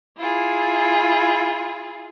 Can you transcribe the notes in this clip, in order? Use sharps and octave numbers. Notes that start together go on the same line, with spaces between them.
E4 F4 G#4